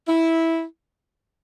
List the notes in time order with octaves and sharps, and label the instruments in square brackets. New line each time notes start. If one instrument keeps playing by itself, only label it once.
[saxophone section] E4